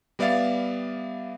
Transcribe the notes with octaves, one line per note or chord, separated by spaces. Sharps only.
G3 B3 D5 E5 F5 A6